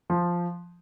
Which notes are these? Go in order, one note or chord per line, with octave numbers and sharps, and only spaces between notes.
F3